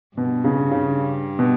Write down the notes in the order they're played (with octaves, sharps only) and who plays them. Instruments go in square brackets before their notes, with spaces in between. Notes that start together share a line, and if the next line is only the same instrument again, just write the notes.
[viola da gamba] G2 [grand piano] B2
[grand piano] C#3
C#3
B2